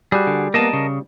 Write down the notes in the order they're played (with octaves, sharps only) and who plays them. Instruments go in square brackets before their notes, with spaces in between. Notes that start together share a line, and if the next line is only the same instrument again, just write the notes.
[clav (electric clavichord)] G3 [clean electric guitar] F#4 G#4
[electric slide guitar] D3
[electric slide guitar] A#3 B3 [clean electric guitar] A#4 D#5 A5
[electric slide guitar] C#3